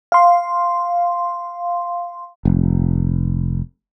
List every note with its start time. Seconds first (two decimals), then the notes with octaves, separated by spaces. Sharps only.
0.12 F5 C6
2.45 F1